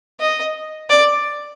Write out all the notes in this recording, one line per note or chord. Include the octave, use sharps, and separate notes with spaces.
D#5
D5